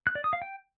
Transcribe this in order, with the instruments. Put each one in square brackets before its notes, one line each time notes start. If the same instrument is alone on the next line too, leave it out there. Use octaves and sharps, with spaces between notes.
[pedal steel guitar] F#6
D5
D#6
F5
G5